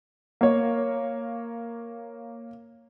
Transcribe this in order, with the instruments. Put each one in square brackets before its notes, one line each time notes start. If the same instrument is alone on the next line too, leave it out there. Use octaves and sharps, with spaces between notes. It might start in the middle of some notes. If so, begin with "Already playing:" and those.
[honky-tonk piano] A#3 C#5